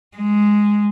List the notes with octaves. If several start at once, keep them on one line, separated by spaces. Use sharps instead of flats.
G#3